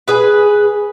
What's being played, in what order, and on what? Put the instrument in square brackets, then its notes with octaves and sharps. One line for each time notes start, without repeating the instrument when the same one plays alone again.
[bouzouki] G#4 B4